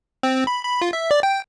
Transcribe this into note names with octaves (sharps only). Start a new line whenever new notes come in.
C4
B5
B5
F4
E5
D5
G5